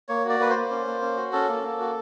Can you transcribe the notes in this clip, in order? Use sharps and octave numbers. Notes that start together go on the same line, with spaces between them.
A#3 C#5
F#4 D5
A#3 B4
C5
A#3
C#4
A#3
C#4
F#4
C#4 A4
A#3
A#3
F#4